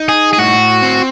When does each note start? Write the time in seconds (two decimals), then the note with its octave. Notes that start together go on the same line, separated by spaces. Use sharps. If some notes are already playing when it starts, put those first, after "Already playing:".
Already playing: D#4
0.09 G#4
0.33 G#4
0.38 A2 F#4
0.82 C4